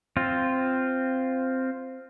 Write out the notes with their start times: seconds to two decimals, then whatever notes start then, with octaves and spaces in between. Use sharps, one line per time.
0.17 C4 F4